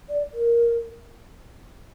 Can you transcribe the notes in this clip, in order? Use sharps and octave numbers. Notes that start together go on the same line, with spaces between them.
D5
A#4